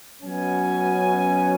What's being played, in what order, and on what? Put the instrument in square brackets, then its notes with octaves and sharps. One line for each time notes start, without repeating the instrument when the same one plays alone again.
[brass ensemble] B2 F#3 C#4 G#5